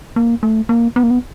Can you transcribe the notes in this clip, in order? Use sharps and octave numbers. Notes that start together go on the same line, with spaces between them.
A#3
A3
A#3
B3
A#3
B3